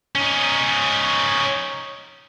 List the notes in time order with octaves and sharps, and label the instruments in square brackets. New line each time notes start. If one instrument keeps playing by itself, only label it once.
[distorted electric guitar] C#4 D#4